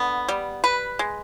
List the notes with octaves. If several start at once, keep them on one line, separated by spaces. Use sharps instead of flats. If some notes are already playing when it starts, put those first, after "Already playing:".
Already playing: D3 B3
G3
B4
G#3